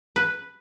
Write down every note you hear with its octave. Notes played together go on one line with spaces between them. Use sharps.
B4